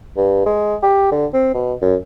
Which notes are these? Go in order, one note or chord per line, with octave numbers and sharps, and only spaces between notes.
G2
G#3
G4
D3
C4
B2
F#2